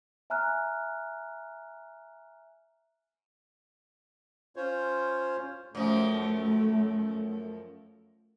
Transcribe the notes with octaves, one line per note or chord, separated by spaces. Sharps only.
E5 G#5 A#5 F6 F#6
C#4 F4 C5 C#5
F#2 F3 A3